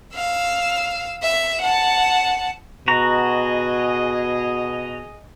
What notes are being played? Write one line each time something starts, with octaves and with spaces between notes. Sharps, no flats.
F5 E6
E5
F#5 A5
B2 F#4 G#4 D#5 A#5